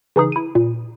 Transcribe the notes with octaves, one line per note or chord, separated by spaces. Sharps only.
C#3 E3 D#4 G#4
E4 D#7
A#2